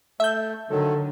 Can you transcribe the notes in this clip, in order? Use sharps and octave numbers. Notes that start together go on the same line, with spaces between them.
A3 E5 G6
D3 D#3 F#3 A4